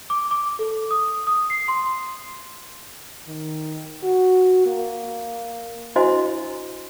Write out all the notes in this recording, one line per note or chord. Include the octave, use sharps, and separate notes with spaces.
D6
D6
A4
D#6
D#6
C7
C6
D#3
F#4
A#3
D4 E4 F#4 C5 D#5 C6